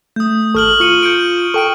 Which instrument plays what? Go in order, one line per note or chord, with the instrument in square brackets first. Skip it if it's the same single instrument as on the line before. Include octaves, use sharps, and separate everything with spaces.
[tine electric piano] A3 [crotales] D#6 G6
[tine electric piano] G#1 A4 [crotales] C#6 F6 F#7
[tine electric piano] F4 [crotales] C#6 C#7 D#7
[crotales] G6 C#7 D7
[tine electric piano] A4 G5 [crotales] C#6 D7